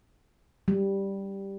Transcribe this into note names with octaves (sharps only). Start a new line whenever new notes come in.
G3